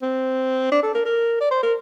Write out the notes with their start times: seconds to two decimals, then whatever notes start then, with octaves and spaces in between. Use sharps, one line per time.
0.02 C4
0.72 D4
0.83 A4
0.95 A#4
1.05 A#4
1.41 D5
1.51 C5
1.63 A#4